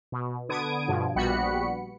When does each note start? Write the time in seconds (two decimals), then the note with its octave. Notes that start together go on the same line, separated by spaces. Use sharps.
0.12 B2
0.49 D3 B3 D#6 G#6 D7
0.88 G2 B2 F3
1.15 A#1 G3 B3 F#4 B5 C#7